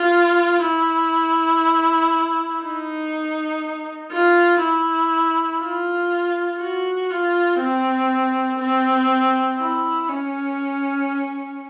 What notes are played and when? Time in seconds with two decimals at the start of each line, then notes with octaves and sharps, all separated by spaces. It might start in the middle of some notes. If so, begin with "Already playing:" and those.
Already playing: F4
0.64 E4
2.63 D#4
4.12 F4
4.62 E4
5.61 F4
6.60 F#4
7.10 F4
7.60 C4
8.59 C4
9.59 E4
10.09 C#4